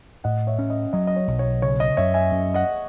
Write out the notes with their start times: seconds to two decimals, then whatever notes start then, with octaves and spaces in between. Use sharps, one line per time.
0.24 A2 D#5 F#5
0.47 C#5 E5
0.59 C#4
0.70 D#5
0.93 F#3 D#5
1.07 D#5
1.16 C#5
1.28 B1
1.39 C#5
1.62 C#3 C#5
1.80 D#5
1.97 F#2 C#5 E5
2.14 E5 G#5
2.32 F#2
2.54 D#5 F#5